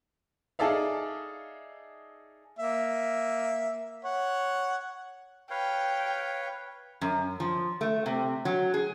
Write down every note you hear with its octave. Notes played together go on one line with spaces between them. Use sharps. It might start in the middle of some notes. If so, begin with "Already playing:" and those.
D#4 G#4 A4 D5 E5 F5
A#3 E5
C#5 F#5
B4 C#5 F5 G5
F#2
F3
A3
C3
F#3
G#4